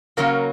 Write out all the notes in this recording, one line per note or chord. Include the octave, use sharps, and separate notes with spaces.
C#3 F#3 A#3 C#4 A#4